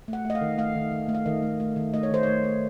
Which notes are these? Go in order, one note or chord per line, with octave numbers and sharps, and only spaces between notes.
A3
F#5
A3 D#5
F5
D#3
A3 F5
D#3
D#3
A3
F5
D#3 D#5
A3
A3
D#3
A3 D#5
C#5
D#3 C5
A3 C#5
A3